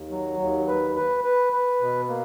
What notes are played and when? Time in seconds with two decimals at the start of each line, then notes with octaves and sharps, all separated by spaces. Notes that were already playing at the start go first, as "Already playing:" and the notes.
Already playing: D#2
0.11 F#3
0.39 D#2
0.68 B4
0.96 B4
1.24 B4
1.53 B4
1.81 B2
2.09 A#3